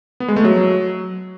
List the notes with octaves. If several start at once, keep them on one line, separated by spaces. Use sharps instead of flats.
B3
G#3
A3
F#3